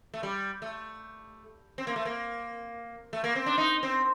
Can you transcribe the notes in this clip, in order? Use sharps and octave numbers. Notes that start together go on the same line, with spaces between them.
A3
G3
A3
C4
A#3
A3
A#3
A3
A#3
C4
D4
D#4
C4